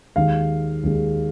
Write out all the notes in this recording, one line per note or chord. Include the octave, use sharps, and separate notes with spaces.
D#2 D#3 G#3 F5
D#2 D#3 G#3